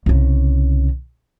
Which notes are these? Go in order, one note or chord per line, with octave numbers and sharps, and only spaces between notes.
C2 C#3